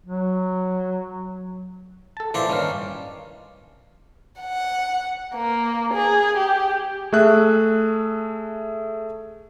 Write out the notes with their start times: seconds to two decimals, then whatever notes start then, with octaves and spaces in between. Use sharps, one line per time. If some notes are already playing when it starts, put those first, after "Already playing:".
0.06 F#3
2.17 A4 A5
2.34 A#2 E3 F3 D4 C5
2.50 G2 D#3 C#4 F5
4.41 F#5
5.35 A#3
5.94 G#4
6.37 G4
7.13 A3 G#4 E5 F#6